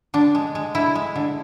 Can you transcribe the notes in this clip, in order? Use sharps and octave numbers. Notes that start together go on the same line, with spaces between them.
D3 D4
G#3
G#3
D3 E4
G#3
D3